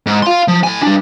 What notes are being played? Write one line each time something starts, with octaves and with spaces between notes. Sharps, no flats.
G#2
F5 C6
F3
A2 G#5
G3 D4